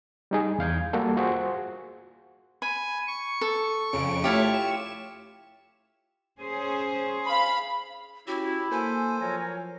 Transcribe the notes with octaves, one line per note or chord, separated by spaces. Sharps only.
G3 D#4 G#4
E2 F5 G6 G#6
G3 A#3 F#4 A4
F4 F#4 G#4 C5
G#5 B5
C#6
A4
F2 C#3 D7
A3 E4 F4 G4 C#5
E7
C#4 G#4 C5
F5 B5
C#4 E4 F#4 G4
A#3 A4 C5 G#5
F3 F#3 A#4 C#5 A#5